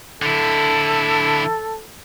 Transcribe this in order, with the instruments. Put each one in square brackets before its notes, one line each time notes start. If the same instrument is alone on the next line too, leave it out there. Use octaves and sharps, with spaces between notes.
[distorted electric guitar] D3 E4 [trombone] A4